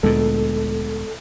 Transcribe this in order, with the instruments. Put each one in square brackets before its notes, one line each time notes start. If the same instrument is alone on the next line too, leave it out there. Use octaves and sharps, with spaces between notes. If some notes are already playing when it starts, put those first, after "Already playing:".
[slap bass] D2 A#2 [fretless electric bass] G#3 B3 [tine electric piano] A4